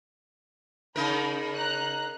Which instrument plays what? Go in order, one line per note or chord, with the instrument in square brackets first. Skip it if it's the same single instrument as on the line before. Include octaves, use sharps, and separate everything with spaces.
[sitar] C#3 D#4 A#4 [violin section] B5
[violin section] A#5 F#6